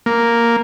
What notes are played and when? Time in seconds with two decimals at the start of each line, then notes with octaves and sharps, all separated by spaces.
0.06 A#3